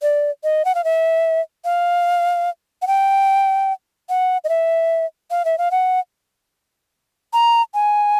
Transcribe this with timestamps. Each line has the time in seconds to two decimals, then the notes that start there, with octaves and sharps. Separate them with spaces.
0.02 D5
0.44 D#5
0.65 F#5
0.75 F5
0.84 E5
1.65 F5
2.82 F#5
2.87 G5
4.09 F#5
4.44 D#5
4.49 E5
5.31 F5
5.45 E5
5.58 F5
5.71 F#5
7.33 A#5
7.74 G#5